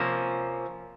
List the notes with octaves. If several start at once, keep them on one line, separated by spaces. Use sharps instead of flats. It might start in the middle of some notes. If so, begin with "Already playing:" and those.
Already playing: C3 F3 A#3 C#4